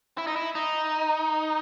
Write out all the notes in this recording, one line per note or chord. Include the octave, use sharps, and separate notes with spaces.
E4
D#4
E4
D#4